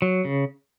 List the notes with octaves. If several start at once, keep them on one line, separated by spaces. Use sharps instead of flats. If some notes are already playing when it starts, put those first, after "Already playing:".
F#3
C#3